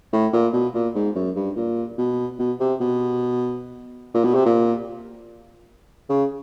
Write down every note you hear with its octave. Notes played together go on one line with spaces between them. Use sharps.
A2
A#2
B2
A#2
G#2
F#2
G2
A#2
B2
B2
C3
B2
A#2
B2
C3
A#2
C#3